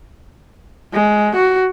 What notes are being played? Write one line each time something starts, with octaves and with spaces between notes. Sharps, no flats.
G#3
F#4